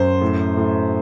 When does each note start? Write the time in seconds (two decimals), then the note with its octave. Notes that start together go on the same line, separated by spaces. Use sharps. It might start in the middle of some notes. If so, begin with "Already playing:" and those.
Already playing: F#2 C5
0.22 A2
0.57 A2